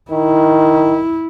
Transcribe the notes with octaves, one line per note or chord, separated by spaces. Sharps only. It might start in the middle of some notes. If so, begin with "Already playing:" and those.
D#3 E4